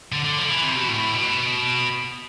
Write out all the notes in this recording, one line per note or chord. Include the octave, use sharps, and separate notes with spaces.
D3
D3
F3
D3
E3
C3
B2
A2
B2